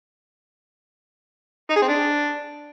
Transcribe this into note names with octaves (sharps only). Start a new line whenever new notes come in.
D#4
G#4
C4
D4